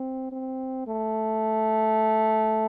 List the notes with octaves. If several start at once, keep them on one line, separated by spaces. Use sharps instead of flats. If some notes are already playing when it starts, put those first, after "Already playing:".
Already playing: C4
C4
A3